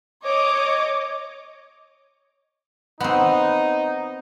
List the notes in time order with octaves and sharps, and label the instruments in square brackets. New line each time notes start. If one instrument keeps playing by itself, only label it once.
[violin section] C#5 D#5 D6
[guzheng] B3 C4 [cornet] D#4